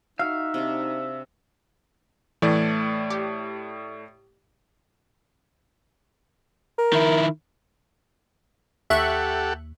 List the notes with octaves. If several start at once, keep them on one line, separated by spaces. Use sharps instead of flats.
D#4 F#4 E5 F5
C3 D4
A2 E3 A3 D5
G4
A#4
D#3 E4
D#2 G4 A4 E5 F#5 C#6 F#6